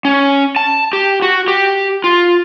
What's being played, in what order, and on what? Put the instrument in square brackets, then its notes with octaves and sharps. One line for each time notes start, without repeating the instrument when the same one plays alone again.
[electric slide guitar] C#4
A5
G4
F#4
G4
F4